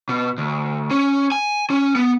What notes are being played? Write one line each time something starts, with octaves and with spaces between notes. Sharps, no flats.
B2
D2
C#4
G#5
C#4
B3